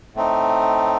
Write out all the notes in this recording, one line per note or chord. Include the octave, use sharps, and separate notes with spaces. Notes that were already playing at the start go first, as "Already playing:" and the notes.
A2 A3 C4 D#4